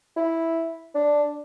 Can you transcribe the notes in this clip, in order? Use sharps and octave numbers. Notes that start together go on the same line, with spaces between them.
E4
D4